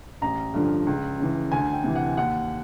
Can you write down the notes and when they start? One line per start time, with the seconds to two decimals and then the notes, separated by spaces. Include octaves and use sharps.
0.22 A1 A#5
0.54 G2 D3 F3
0.87 C#2
1.19 C#3 E3
1.52 D2 G#5
1.73 G5
1.84 C3 E3
1.96 F#5
2.17 D#2 F#5